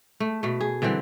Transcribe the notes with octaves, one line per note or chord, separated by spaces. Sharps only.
A3
B2 A3
G#4
D3 E3 G3 C4